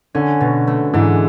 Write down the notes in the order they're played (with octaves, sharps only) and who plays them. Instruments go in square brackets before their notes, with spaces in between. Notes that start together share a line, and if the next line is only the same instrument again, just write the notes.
[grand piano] D3 [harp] C#4
[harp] B2
A3
[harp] G#2 [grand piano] E3